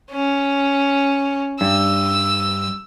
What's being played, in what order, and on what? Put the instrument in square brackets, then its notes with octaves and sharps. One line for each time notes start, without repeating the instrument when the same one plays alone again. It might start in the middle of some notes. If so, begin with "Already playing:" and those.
[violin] C#4
[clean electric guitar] G2 [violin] E6